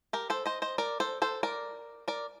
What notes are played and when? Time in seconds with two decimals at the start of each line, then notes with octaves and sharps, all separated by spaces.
0.13 G4 A#4
0.30 A4 C5
0.46 C5 D#5
0.62 C5 D#5
0.78 A#4 D5
1.00 A4 C5
1.22 A4 C5
1.43 A#4 D5
2.08 A#4 D5